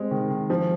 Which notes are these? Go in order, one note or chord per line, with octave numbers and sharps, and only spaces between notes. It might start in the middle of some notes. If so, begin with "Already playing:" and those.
Already playing: G#3 C4
D#3
D#3
F3